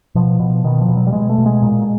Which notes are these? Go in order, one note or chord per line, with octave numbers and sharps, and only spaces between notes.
B2 F3
B2
B2 D#3
F3
B2
F#3
G3
B2 G#3
A3
B2
G#3
A#2